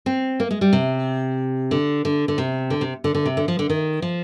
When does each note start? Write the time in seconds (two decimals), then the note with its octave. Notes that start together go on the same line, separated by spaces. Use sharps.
0.06 C4
0.40 A#3
0.51 G#3
0.61 G3
0.73 C3
1.71 D3
2.05 D3
2.28 D3
2.38 C3
2.70 D3
2.81 C3
3.04 D3
3.15 D3
3.26 C3
3.37 D3
3.48 F3
3.59 D3
3.70 D#3
4.02 F3